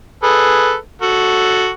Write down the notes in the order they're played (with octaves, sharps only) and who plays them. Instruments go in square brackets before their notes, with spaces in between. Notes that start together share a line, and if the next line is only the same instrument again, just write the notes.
[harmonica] G#4 A4 B4
F#4 A4